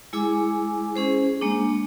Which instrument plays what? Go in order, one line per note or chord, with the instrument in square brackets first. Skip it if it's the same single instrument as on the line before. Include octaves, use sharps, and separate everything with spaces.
[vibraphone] G#3 E4 G#4 G#5 D6
C#4 G#4 C5
G#3 A#3 D4